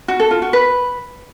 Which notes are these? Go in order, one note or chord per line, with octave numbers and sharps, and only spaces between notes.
F#4
A4
F4
F#4
B4